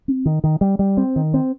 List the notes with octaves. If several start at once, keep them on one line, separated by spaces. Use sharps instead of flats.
C4
D#3
D#3
G3
G3
C4
D#3
C4